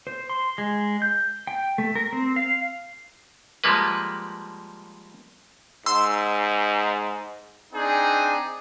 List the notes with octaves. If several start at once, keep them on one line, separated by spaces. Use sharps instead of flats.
C5
C6
G#3
G6
G5
A3
A#4
C4
F5
F3 G3 G#3 A#3 B4
G#2 C6 E6
C4 D4 D#4 G#4